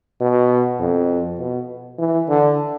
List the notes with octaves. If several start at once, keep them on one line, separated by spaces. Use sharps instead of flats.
B2
F2
B2
E3
D3